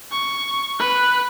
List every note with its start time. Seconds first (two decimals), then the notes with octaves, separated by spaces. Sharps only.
0.11 C#6
0.80 B4 F#6